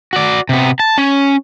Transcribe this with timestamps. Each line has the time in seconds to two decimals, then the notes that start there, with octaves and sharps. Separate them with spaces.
0.13 F#4 D5
0.49 C3 B3
0.80 A5
0.98 C#4